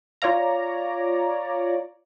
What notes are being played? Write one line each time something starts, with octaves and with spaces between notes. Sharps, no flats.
F4 C#5 D5 F5 A#5